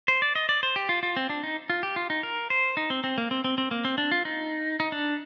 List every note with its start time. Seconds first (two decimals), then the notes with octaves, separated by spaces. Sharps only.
0.08 C5
0.22 D5
0.35 D#5
0.49 D5
0.63 C5
0.76 G4
0.89 F4
1.03 F4
1.16 C4
1.30 D4
1.43 D#4
1.70 F4
1.83 G4
1.96 F4
2.10 D#4
2.23 A#4
2.50 C5
2.77 D#4
2.90 C4
3.04 C4
3.18 A#3
3.31 C4
3.44 C4
3.58 C4
3.71 A#3
3.85 C4
3.98 D4
4.11 F4
4.25 D#4
4.80 D#4
4.92 D4